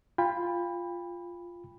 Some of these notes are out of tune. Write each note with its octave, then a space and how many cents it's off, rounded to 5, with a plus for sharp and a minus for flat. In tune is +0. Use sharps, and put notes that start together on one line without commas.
F4 +0 G5 +30 B5 +0